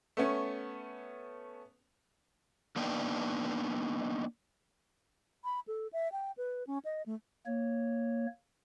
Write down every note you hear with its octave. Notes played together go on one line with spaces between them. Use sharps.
A3 B3 C#4
A#3 B3 D4 D#4 G5
B5
A4
E5
G5
B4
C#4
D#5
A3
A#3 C#5